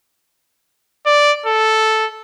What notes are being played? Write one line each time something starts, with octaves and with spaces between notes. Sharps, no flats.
D5
A4